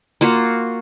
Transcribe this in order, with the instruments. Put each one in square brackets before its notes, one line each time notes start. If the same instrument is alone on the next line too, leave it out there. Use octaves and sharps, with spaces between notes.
[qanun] A#3 F4 F#4